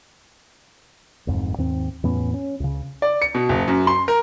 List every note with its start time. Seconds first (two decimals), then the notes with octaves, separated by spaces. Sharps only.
1.27 D1 F2 G#2
1.58 D#2 G#2 C4
2.03 E2 A2 B3 C#4
2.34 C#4
2.60 C#2 C#3
3.02 D5
3.22 C#7
3.35 B2
3.49 F#1
3.68 F#2
3.87 C6
4.08 A#4